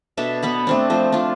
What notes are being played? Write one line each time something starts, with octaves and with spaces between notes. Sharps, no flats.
B2 D4 A4 E5
B3 F#5 B5
A3 C4 D4
F3 A3 C5
D4 F4